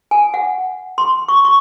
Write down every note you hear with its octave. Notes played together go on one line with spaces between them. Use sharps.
G#5
F#5
C6
C#6
C#6